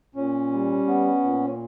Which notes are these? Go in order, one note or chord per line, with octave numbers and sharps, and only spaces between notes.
A#2 C#4
G3
B3
A#2